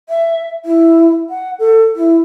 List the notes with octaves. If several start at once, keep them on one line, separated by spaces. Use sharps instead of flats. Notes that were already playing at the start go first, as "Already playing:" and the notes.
E5
E4
F#5
A4
E4